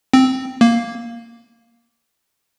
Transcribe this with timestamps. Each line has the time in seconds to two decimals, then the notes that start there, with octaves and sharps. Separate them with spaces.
0.13 C4
0.61 A#3